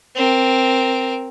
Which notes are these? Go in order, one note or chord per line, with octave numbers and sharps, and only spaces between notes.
C4 A#4